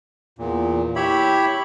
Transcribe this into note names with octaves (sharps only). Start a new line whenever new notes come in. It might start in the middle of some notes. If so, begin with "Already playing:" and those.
E2 A#2
E4 G4 C#5 E5 B5